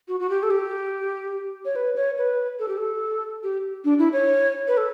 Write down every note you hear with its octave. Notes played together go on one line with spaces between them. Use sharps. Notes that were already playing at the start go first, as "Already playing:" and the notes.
F#4
F#4
G4
A4
G4
C#5
B4
C#5
B4
A4
G4
A4
G4
D4
E4
C#5
B4
A4